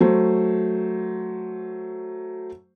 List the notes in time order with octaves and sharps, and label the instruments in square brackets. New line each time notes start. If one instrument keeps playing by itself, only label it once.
[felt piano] F#3 A3 C5